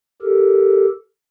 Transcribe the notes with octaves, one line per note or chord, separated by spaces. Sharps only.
G4 A4 A#4